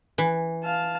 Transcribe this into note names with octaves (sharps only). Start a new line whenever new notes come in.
E3
F5 A5